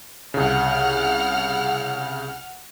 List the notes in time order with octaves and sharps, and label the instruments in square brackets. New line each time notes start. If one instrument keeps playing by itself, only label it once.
[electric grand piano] C2 C#3 [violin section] F#5 F6